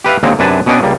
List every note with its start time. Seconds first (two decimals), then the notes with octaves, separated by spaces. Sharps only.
0.04 G4 B4 E5 F5
0.23 D#2 D3 G#3 A#3 C4
0.39 F#2 C3 D4 B4 G#5 A5
0.66 B2 B3 C#4 D4 D#5 G5
0.83 C#2 G3 A#3